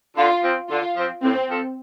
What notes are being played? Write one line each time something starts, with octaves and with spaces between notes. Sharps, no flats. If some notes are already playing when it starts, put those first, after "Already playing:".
D3 F4
F3 C4
D3 F4
F3 C4
A2 C4
F3 C4 A4